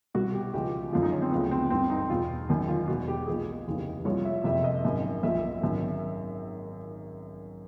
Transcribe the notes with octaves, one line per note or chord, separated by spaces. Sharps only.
C2 B2 F#4
G4
C#2 C#3 F3 G4
F#1 F#2 D3 F3 F4
D#4
C#4
C4
D2 C#3 F3 B3
C4
G1 G2 E3 C4
D#4
E2 B2 F4
F#1 F#2 D#3
F4
E1 E2 B2 F#4
G4
B1 A#2 F3 G#4
F1 D#2 C#3 E3
C2 A#2 F3 C#5
E5
F#1 F2 C3 E5
D#5
G#1 F#2 D#3
B1 A#2 F3 E5
G#1 F#2 D#3